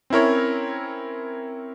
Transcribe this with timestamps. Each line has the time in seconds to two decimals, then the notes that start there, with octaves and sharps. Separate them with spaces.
0.10 C4 C#4 E4 A#4 C#5